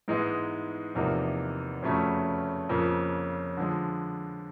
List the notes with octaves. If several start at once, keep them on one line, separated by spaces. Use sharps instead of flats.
G#2 E3 G#3 B3 D#4
E2 C3 F3 A#3 D#4
F2 C#3 F#3 A3 C#4
F2 C#3 F3 A#3
D3 F3 G#3